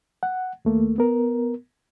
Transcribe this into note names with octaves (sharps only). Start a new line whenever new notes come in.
F#5
D#2 A3 A#3
B3 A#4